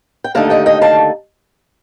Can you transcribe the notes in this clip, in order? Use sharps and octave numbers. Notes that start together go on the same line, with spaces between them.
G5
D#2 D3 A3 D#4 F5 A5
D#5 G5
D#5 G5
F5 A5